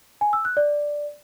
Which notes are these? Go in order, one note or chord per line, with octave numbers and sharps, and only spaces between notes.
G#5
E6
F#6
D5